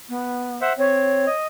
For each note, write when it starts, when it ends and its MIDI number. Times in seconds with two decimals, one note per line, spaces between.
0.09 0.58 59
0.61 0.73 72
0.61 0.73 76
0.61 0.73 78
0.78 1.26 60
0.78 1.28 73
1.27 1.47 75